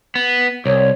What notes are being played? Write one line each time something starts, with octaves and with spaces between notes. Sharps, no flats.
B3
C2 C#5